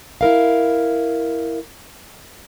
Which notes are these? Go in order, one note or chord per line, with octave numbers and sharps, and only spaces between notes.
E4 A#4 F5